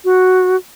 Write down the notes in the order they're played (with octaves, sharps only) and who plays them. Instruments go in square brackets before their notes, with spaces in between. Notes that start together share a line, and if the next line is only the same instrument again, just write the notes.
[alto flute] F#4